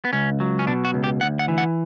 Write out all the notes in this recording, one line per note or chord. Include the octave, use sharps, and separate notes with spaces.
B3
C#2 C#4
F#3
C#4
B2 D4
F#4
C#2
G4
D2 F#5
F#5
E3
F#5